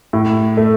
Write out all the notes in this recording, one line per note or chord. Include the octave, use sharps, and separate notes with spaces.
A2
A3